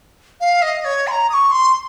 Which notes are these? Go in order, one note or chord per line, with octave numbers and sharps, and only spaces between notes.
F5
D#5
C#5
C6
A#5
D#6
C#6
C6